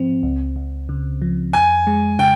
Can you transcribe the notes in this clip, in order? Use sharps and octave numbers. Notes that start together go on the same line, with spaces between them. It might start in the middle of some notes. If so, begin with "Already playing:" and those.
Already playing: G#2 F3 C4
C#2
C#2
C#3
F3
F2 G#5
G#3
C#3 G5